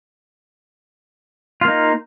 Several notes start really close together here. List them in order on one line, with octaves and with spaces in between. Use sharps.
F4 A#3 D#4